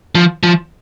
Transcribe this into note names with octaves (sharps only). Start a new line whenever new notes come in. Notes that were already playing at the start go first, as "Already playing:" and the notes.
F3
F3